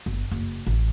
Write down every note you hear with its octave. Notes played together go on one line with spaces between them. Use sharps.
G1
F#1
A1